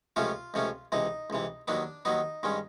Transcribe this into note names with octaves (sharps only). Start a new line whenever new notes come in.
C#2 C3 F3 A3 C#4 F4
C#2 C3 F3 A3 C#4
C#2 C3 E3 D#4
C#2 C3 E3
D#2 D#3 F#3 B3 D4
D#2 D#3 F#3 B3 D#4
G2 D#3 G#3 C#4